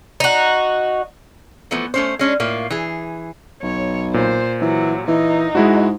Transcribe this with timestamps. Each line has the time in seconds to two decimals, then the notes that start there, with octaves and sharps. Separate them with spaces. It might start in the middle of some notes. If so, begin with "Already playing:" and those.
0.20 D#4 F#4
1.71 E3 F3 A3 B3
1.94 A3 C#4 C5
2.19 G#3 C#4 D4
2.40 A2 A#3 F4
2.70 E3 G#4
3.63 B1 C#5
4.14 A#2 C5
4.62 E3 F#3
5.08 E3 D#4
5.55 G#2 G#3 E4 F#4